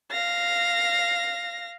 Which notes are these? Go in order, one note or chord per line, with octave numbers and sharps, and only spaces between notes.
F5 A#6